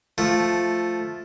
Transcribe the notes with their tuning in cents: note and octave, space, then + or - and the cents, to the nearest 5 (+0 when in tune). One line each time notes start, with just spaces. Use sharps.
F3 +0 A3 +0